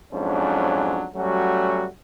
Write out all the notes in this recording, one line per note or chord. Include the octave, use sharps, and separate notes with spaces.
F2 G#2 F#3 C#4 D4
F#3 G3 A3 C#4 F#4